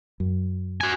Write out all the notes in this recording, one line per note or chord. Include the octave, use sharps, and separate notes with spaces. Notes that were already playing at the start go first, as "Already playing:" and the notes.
F#2
F#4 G#5